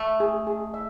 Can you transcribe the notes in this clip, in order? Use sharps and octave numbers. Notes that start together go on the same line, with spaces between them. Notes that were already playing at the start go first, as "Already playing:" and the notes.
Already playing: A3 E5
G#4
G#4
E5